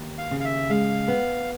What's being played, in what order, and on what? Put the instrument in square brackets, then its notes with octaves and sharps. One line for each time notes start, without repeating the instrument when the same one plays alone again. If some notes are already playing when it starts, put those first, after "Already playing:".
Already playing: [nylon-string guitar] D#2
[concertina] F5
[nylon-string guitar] C#3
[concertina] F5
E5
[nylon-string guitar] G#3 [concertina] F5
[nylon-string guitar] B3